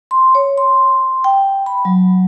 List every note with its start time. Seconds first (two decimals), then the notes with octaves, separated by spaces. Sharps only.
0.11 C6
0.35 C#5
0.58 C6
1.24 G5
1.66 B5
1.85 F#3